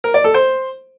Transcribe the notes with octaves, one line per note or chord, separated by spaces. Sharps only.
A#4
D5
A4
C5